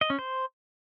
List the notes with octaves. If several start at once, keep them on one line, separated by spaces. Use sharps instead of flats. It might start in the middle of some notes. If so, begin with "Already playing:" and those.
D#5
C#4
C5